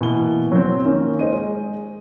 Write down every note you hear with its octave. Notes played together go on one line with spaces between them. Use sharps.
B2 E3 A#3 G7
F#3 C4
D#3 A#3 C#4
G#3 C5 D#5 D#7
G#3